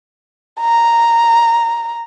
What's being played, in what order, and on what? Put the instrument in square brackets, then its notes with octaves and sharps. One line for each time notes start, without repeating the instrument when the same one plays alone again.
[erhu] A#5